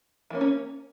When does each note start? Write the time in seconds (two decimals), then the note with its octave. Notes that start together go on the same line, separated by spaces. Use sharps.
0.30 E3 A#3 C#4
0.41 C#4 C#5